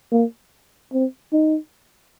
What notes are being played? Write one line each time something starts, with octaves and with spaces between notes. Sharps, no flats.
A#3
C4
D#4